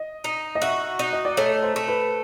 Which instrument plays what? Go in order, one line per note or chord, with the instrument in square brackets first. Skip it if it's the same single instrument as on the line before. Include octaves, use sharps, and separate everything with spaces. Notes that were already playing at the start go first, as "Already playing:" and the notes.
Already playing: [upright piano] D#5
[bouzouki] D#4
[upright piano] D#5
[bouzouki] F#4 [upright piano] E5
[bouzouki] D#4
[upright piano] D#5
D5
[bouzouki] A3 [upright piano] C#5
[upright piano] C5
[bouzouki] A3
[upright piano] B4